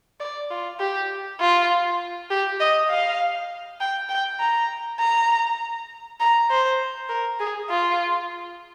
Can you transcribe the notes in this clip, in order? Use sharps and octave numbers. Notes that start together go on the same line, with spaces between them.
D5
F4
G4
F4
G4
D#5
F5
G5
G5
A#5
A#5
A#5
C5
A#4
G#4
F4